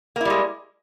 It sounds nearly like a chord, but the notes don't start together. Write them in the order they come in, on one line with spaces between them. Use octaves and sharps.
A#3 E4 G3 G#3